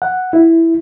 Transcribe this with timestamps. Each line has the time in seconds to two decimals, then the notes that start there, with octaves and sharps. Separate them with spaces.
0.02 F#5
0.33 E4